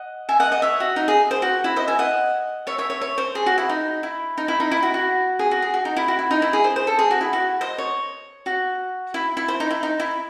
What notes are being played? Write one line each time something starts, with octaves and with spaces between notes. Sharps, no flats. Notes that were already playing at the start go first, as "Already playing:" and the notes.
Already playing: D#5 F#5
E5 G#5
D#5 F#5
D#5 F#5
C#5 E5
F#4
D#4
G#4
C5
F#4
E4
C5 D#5
E5 G#5
D#5 F#5
C#5 E5
C#5 E5
C#5 E5
C#5
C5
G#4
F#4
E4
D#4
E4
D#4
E4
D#4
E4
F#4
F#4
G#4
F#4
G#4
F#4
D#4
E4
F#4
E4
D#4
E4
G#4
C5
C5
A4
G#4
F#4
E4
F#4
C5 D#5
C#5
F#4
E4
E4
C5
D#4
E4
D#4
E4